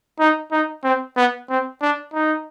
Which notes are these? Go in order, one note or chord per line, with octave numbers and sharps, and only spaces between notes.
D#4
D#4
C4
B3
C4
D4
D#4